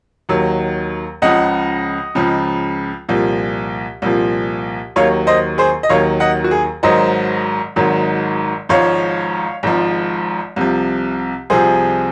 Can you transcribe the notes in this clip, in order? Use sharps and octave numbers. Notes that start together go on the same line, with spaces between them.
D#2 D#3 F#3
C#2 C#3 F3 D#5 F#5
C#2 C#3 F3
C2 A#2 F3
C2 A#2 F3
D#2 D#3 F#3 C#5 F5
C5 D#5
G#4 C5
D#5
D#2 D#3 F#3 C#5 F5
D#5 F#5
F#4
G#4
G#1 G#2 D#3 F#3 C5 D#5
G#1 G#2 D#3 F#3
G#1 G#2 F3 C#5 F5
G#1 G#2 F3
C2 C3 F3
C2 C3 F3 G#4 C5